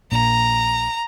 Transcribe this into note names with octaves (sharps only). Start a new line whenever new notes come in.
A#1 A#2 A#5